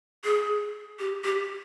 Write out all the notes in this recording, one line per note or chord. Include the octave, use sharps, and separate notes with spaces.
G#4
G4
G4